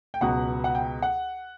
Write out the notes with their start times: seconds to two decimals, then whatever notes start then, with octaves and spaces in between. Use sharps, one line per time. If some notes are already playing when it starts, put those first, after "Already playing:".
0.14 G5
0.21 C#2 B2 F#3 F#5
0.64 F#5
0.75 G5
1.02 F#5